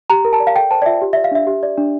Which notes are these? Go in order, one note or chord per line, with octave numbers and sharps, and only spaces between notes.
G4 A#5
A#4
A5
D5
F5
A4 G5
C5 A5
D5
F4 E5
G4
D5 E5
F5
D4 E5
G4
D5
D4